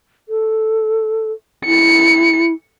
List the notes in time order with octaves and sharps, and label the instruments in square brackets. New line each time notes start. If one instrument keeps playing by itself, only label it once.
[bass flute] A4
[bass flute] E4 [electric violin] C#7